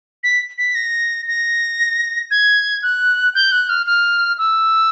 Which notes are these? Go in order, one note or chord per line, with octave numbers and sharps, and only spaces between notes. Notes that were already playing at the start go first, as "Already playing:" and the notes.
B6
B6
A#6
A#6
G#6
F#6
G6
F#6
F6
F6
E6